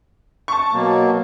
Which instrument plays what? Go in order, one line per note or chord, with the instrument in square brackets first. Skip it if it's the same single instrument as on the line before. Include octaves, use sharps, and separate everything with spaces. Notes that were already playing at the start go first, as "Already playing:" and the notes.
[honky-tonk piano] A5 C#6
[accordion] B2 F#3 A#3